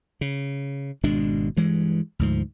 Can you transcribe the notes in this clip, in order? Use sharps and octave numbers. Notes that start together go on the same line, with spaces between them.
C#3
G#1 B2 G#3 D4
G2 E3 G#3
D2 G#2 F3